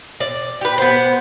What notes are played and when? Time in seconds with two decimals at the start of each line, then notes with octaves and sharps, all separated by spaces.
0.20 D5
0.61 G4 B4
0.78 B3 C5